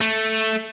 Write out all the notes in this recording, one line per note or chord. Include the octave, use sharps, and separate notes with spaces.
A3